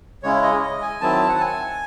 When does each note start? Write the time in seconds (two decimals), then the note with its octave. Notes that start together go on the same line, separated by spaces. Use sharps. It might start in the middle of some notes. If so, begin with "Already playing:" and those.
0.23 C#3 G#3 C#4 E4 C#5
0.42 D#5
0.62 D#5
0.82 G#5
1.01 D#3 F#3 C4 E4 A5
1.29 F#5
1.40 G#5